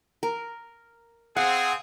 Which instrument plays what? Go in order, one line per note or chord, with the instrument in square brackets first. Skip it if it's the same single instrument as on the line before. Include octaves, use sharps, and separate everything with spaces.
[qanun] A#4
[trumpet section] C4 G#4 [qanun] F5 [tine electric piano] F#5